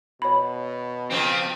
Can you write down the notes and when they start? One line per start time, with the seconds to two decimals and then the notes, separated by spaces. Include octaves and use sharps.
0.22 B2 C#5 B5
1.11 F2 C#3 F3 C4